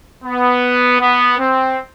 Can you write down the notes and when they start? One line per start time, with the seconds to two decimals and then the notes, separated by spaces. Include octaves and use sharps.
0.24 B3
1.00 B3
1.38 C4